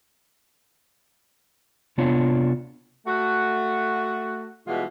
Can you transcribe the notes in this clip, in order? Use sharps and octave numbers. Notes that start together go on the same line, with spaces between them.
C3 B3 D4 F4 C#5
A3 F#4
B2 E3 G3 G#3 F4